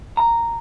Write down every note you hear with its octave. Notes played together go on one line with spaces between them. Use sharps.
A#5